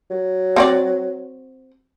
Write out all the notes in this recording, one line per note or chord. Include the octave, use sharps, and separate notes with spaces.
F#3
C4 F#4 D5